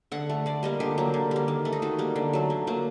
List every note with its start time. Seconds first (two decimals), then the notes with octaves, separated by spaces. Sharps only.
0.12 D3 F#5
0.30 A3
0.46 D3 D5
0.63 G3 A#3 D#5
0.80 D3 G4
0.98 F#3 A#3
1.14 D3
1.31 G3 A#3
1.48 D#3
1.65 A3
1.73 D#4
1.82 D#3 F#4
1.99 G3 A#3
2.16 D3
2.33 F#3 A3
2.50 D3
2.67 F#3 A#3